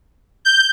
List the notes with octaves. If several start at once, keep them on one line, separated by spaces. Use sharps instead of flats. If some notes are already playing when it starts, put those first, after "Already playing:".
G6